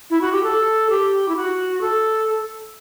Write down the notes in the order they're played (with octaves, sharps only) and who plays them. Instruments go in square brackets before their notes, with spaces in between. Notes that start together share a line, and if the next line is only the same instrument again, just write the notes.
[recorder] E4
F#4
G4
A4
G4
E4
F#4
A4